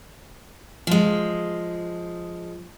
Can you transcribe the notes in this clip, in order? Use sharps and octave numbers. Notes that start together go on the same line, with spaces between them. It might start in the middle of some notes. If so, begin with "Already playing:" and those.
F3 G#3